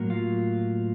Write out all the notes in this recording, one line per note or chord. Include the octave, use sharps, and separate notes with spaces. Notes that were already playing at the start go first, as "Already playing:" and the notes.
Already playing: A2 F#3 A#3
F4